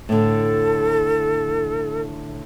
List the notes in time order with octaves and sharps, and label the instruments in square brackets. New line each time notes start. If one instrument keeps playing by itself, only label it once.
[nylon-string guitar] A2 D3 [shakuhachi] A4